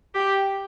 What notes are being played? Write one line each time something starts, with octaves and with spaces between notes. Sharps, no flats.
G4